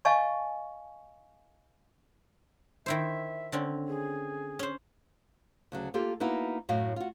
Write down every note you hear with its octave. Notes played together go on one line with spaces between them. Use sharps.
D#5 F5 G#5 A5 C#6
D#3 E4 C5 E5
D3 C4 C#4
G#4
C#4 C5
D2 C#3 F#3
A#3 F4 G4 A4
A#3 B3 D#4 E4 F#4
F#2 A2 F#4 D#5 F5
F4 F#4